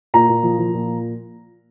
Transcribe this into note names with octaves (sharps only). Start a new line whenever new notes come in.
A#2 A#5
A#2
F3
F3
A#2